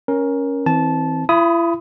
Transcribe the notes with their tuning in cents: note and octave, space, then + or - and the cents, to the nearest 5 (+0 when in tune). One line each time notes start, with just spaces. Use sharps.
C#4 +0 A#4 +10
E3 -35 C4 +0 A5 -15
E4 +40 B5 +0 D#6 +10